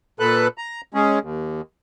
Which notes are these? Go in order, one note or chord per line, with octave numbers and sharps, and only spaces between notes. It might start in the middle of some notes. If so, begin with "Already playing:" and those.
A#2 A4 B4 F#6
A#5
G#3 C#4 G#4
D#2